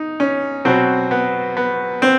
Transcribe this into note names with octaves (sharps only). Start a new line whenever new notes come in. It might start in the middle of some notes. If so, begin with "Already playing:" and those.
Already playing: D#4
C#4
B2 F#3 C4
B3
B3
C4